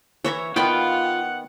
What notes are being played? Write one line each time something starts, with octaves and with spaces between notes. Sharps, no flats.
E3 C#5 E5 A#5
D#3 B3 F4 F#5 G5 B5